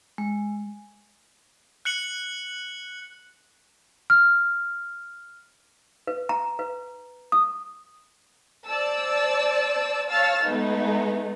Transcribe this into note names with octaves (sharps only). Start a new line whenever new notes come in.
G#3
F#6 C#7 F#7
F6
B4
A#5
B4
D#6
C5 D5 A5 E6
C#5 F5 A5 E6 F6 A6
G#3 A3 B3 D#4